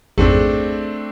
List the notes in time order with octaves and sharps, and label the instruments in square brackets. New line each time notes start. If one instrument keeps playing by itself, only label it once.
[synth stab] A1 F2 G#2 [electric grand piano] A3 C4 D4 [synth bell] G#4